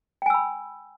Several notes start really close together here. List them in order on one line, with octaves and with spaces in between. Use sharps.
G5 G#5 E6 B5